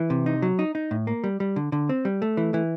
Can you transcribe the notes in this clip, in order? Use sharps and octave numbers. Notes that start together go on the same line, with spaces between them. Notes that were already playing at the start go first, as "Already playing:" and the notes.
Already playing: E3
C3
D#4
F#3
D#4
D#4
A2
A#3
G3
G3
D3
D3
C4
G3
A3
E3
E3